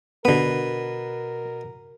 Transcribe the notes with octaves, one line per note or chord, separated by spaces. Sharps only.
B2 D3 B3 A#4 B4